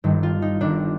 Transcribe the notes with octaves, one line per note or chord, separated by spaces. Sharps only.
G1 G2 D#3
F4
D#4
G1 G2 D#3 D4